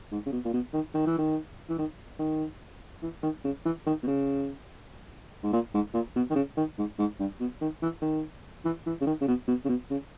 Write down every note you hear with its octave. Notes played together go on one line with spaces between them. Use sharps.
G#2
C#3
B2
A#2
B2
D#3
D#3
E3
D#3
E3
D#3
D#3
E3
D#3
C#3
E3
D#3
B2
C#3
G#2
A#2
G#2
A#2
B2
D#3
C#3
D#3
G#2
G#2
G2
B2
D#3
E3
D#3
E3
E3
C#3
D#3
C#3
B2
B2
C#3
B2
C#3